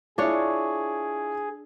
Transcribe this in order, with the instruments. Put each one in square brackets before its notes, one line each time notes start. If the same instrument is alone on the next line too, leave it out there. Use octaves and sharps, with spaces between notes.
[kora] D4 C#5 [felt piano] E4 F4 [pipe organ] G#4